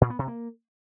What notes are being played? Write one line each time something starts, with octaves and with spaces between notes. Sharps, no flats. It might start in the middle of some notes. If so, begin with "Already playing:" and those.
A#2
B3
C3
A#3